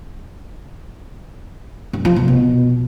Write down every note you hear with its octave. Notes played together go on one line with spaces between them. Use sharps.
G2
F3
B2
B2